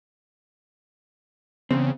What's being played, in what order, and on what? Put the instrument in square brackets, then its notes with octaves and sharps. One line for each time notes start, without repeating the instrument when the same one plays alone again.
[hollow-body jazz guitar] E2 G2 C4 [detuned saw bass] C#3